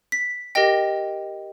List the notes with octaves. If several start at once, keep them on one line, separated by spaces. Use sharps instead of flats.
B6
G4 A#4 D#5 G5 A#6